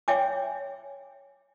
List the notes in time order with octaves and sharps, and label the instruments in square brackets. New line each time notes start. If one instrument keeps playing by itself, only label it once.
[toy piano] C#5 E5 G5 G#5 D6